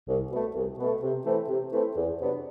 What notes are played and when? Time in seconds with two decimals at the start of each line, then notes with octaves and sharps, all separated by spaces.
0.07 C2
0.30 B2 A3
0.54 C2
0.78 B2 A3
1.02 C3
1.24 E3 A3 C4
1.48 C3
1.71 E3 A3 C4
1.95 E2
2.19 C3 F#3 B3 D4